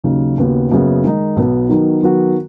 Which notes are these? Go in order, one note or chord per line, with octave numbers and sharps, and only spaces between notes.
D#2 C#3 F#3 D#4
D#2 C#3 B3 F#4
F#1 F#2 C#3 B3 G#4
D#3 G#3 D#4
B1 B2 B3
D#3 F#3 B3 D#4
D#3 F#3 B3 F#4